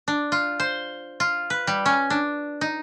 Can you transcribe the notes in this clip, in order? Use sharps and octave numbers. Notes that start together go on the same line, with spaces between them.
D4
F4
C5
F4
B4
G3
C#4
D4
D#4